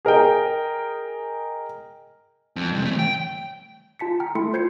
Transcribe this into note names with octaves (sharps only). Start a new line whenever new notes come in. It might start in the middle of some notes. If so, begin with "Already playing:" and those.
G#4 A#4 D#5 G5
F2
G2 C3
E3 A3
G5
F4 A5 B6 C#7
G5 A5 A#5 F6
A3 E4 A4 B5 C6 C#7
F4 C5 G6 G#6 C7 C#7